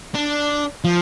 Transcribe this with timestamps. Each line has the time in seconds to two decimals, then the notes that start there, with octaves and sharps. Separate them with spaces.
0.15 D4
0.84 F3